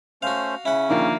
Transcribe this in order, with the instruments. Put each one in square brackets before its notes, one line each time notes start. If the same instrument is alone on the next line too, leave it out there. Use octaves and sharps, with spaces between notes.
[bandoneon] A3 C#4 C5 [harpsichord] F#4 F5
[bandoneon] C#3 C#4 [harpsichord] E4 F#5
[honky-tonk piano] D3 D#3 F3 [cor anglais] A#3